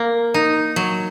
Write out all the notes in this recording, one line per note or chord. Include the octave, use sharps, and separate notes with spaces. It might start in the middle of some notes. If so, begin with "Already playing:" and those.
Already playing: A#3
D#4
F#3